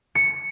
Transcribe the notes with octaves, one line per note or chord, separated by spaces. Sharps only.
C#7